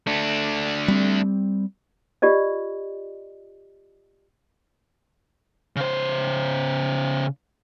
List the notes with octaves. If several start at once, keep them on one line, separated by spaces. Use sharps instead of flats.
A3 D4
G3 C4
F4 G4 D5 D#5
C#3 C5